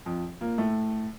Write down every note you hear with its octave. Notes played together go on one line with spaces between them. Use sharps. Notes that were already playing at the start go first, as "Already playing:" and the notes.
F2 F3
A#2 A#3
A2 A3